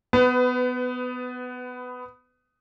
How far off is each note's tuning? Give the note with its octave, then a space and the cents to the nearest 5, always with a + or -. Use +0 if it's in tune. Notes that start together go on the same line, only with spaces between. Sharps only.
B3 +15 B4 +30